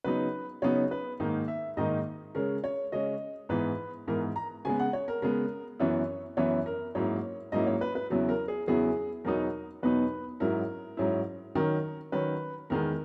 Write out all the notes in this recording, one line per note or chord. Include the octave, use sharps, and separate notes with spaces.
C#3 F#3 B3 D#4 B4
C#3 F#3 B3 D#4 C#5
B4
G#2 D#3 A#3 D#4
E5
G#2 D#3 A#3 D#4 D#5
C#3 G#3 C#4 A#4
C#5
C#3 G#3 C#4 D#5
G#2 E3 B3 B4
G#2 E3 B3 A#4
A#5
C#3 G#3 B3 G#5
F#5
C#5
A#4
C#3 G#3 B3 A#4
F#2 E3 B3 E4 C#5
F#2 E3 B3 E4 C#5
A#4
G#2 F#3 A#3 C#4 E4 C#5
G#2 F#3 A#3 C#4 E4 D#5
C#5
B4
B4
E2 C#3 F#3 B3 E4
A#4
G#4
E2 C#3 F#3 B3 E4 G#4
E2 B2 F#3 B3 D#4 A#4
E2 B2 F#3 B3 D#4 B4
G#2 F#3 C#4 E4 A#4
G#2 F#3 C#4 E4
D#3 F#3 C#4 A#4
D#3 F#3 C#4 B4
E2 D#3 G#3 B3 A#4